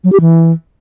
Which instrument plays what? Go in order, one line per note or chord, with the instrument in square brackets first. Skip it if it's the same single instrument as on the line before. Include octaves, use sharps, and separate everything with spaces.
[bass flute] F#3
G4
E3